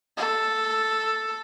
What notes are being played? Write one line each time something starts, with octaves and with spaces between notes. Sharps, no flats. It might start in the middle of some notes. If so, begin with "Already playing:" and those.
A4